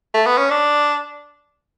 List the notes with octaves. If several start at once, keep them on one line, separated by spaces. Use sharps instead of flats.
A3
B3
C#4
D4